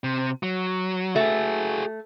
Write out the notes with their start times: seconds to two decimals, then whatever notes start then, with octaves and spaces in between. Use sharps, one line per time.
0.04 C3
0.43 F#3
1.16 A3 F#4 G#4